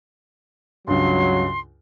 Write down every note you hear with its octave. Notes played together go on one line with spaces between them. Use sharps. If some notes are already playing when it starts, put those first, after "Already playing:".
C#2 G2 F#3 C6